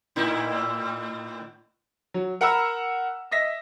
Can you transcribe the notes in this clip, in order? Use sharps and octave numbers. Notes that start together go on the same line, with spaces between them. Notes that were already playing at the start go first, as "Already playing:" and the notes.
A2 D#4 E4
F#3
A#4 F#5 A#5 B5 E6
D#5 E5 A#6 B6